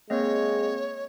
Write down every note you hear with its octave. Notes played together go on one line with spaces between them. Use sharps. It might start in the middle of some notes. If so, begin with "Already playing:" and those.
G#3 A#3 C4 C#5 D#5